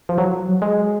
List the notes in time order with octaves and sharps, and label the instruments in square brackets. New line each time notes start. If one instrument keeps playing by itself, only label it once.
[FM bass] F3
F#3
G#3